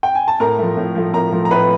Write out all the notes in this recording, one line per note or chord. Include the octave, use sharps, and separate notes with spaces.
G5
G#5
A5
A2 A#4 A#5
F3 A3
A2
F3 A3
A2 A#4 A#5
F3 A3
A#5
A2 B4 B5